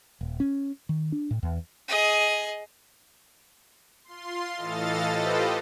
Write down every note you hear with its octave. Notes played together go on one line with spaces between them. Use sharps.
D#1
C#4
D#3
D4
A2
E2
G#4 D#5
F4 C6
A2 E3 A4 D#5 F5 A6
F4 G4 A4 B4 C5 D#5